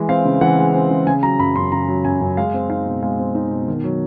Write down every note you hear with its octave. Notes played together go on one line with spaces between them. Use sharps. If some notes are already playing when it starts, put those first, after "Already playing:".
Already playing: E3 G#3
C4 F5
C#3
E3 F#5
G#3
C4
C#3
C#3 G#5
F#3 A#5
F#2 B5
F#2 C6
C#3 A#5
F#3
F#2 G#5
F#2
G#3 F5
C4
D#4 F5
B2
G#3 F5
C4
D#4
B2
D#3
F#3